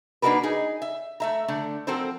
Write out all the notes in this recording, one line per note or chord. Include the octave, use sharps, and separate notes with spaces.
A#3 D4 D#4 F#4 A#4 B4
D#4 G#4 D#5
E5
A3 E5 A#5
D3 A3
F3 C4 F#4 A4 A#4 C5